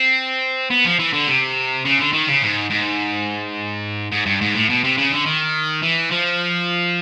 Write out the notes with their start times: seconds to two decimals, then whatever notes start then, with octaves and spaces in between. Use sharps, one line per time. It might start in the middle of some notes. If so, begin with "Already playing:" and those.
Already playing: C4
0.70 B3
0.85 F3
0.99 E3
1.13 D3
1.27 C3
1.85 C#3
1.99 D3
2.12 D#3
2.27 C#3
2.42 G#2
2.70 G#2
4.12 G#2
4.26 G2
4.41 G#2
4.55 A2
4.69 B2
4.84 C3
4.97 C#3
5.12 D3
5.26 D#3
5.83 E3
6.11 F3